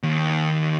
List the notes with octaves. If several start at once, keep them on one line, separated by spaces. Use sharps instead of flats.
D#2